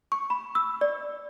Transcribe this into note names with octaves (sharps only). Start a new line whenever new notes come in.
C#6
B5
E6
D5